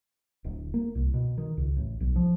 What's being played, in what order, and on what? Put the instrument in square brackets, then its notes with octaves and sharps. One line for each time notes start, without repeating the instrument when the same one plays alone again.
[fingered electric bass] D1
A#3
C2
B2
D#3
C#2
A1
B1
F3